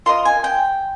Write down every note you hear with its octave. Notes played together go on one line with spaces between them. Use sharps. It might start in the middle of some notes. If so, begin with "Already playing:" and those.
F4 A#4 D#5 C6
G#5
G5